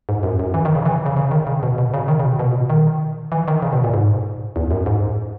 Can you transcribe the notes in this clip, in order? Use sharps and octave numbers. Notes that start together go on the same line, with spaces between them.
G#2
F#2
F#2
E3
D#3
C#3
E3
C#3
C#3
D#3
C#3
B2
B2
C#3
D#3
C#3
B2
B2
A#2
B2
D#3
E3
D#3
C#3
B2
A#2
G#2
E2
F#2
G#2